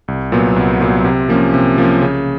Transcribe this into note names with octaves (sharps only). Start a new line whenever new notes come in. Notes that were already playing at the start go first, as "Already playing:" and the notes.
C2
A#2 F#3 B3
C2
A#2 F#3 B3
C3
F3 A#3 C#4
C3
F3 A#3 C#4
C#3